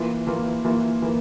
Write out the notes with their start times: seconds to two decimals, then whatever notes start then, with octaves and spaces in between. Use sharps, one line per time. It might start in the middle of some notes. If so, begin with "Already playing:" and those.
Already playing: E3 A#3 F4
0.27 E3 A#3 F4
0.65 E3 A#3 F4
1.02 E3 A#3